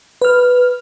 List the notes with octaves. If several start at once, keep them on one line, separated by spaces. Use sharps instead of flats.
B4 F6